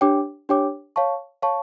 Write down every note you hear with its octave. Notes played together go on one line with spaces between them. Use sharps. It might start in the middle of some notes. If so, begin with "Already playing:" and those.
D4 G4 C#5 G5 D6
D4 G4 C#5 G5 D6
C#5 F5 A5 C#6
C#5 F5 A5 C#6